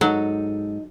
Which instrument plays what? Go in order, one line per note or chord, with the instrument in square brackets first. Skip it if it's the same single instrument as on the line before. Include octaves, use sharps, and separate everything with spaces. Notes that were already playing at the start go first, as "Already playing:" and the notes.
[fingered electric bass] G#2 [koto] F#3 [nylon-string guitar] D#4 A4